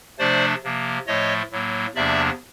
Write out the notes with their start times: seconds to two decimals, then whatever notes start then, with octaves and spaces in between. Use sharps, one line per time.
0.19 C3 F3 A3 D4 C5 D5
0.64 C3 F3 A#3
1.07 A2 F3 A3 C#5 D#5
1.51 A2 F#3 A#3
1.95 E2 C3 F3 A#3 D4 D5 E5